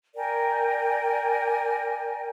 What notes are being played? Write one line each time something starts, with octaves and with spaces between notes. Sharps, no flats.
A#4 D5 G5 G#5